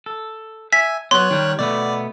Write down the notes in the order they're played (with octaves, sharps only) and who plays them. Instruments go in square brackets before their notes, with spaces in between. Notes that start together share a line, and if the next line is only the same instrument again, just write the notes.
[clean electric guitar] A4
[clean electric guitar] E5 [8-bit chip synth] G#5 [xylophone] B6
[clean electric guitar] F#3 B3 [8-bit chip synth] C#5 F#6 [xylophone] C6
[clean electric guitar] D#3 G3
[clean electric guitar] B2 A3 B3 [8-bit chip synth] D5